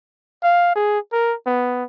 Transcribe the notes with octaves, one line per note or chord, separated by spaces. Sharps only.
F5
G#4
A#4
B3